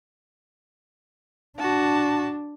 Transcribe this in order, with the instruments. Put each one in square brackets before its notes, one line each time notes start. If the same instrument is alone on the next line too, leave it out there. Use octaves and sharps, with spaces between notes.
[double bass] D4 [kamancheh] F#4 A5